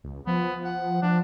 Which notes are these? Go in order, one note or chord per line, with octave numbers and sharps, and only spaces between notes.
C#2
F3 B3
F#5
F3 D4